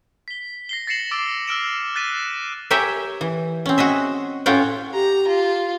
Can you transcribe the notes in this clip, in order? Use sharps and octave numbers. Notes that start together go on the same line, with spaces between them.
B6 G7
A#6 C7 G7
A6 A#6 C7 C#7 E7 F#7
D6 E6 A6 D7
E6 F6 D7 E7
F#6 A6 B6 D#7 E7
G4 A#4 C#5 E5 G5 G#5
E3
C4 C#4
F#4 G#4 D#5 E5
A2 C#4 F4 F#4 C#5 G5
G4 A#5
F4